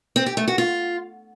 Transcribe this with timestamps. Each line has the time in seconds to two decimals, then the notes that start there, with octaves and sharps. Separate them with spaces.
0.16 C4
0.26 G4
0.37 A3
0.48 F#4
0.58 F4